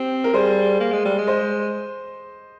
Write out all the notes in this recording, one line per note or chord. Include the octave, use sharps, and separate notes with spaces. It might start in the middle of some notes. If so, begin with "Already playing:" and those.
Already playing: C4 G4
A#4
G3 G#4 C5
A#3
G#3
G3
G#3
C5 D#5